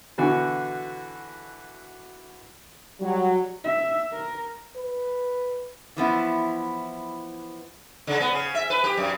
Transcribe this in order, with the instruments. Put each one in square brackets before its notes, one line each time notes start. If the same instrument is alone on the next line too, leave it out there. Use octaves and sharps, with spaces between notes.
[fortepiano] B2 D3 E3 F#4
[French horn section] F#3 [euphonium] G3
[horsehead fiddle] E5
A#4
[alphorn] B4
[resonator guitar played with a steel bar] E3 F3 B3 E4
[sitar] C#3
B3
C#3
E5
B4
G4
F#2